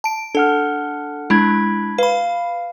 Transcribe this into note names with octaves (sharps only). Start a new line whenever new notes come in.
A5 D7
D4 A4 F#5 F6
G#3 D4 E4 B5 G#6
B4 F5 B5